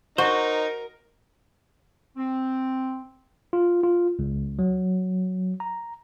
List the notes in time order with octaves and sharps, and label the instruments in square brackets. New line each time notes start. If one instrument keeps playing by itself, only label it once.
[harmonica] D#4 [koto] F#4 [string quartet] A#4 [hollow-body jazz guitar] C5
[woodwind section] C4
[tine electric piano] F4
F4
C#2
F#3
A#5